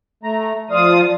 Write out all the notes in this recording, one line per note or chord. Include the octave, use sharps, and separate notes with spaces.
A3 A#5
F3 F4 D5 F5 D#6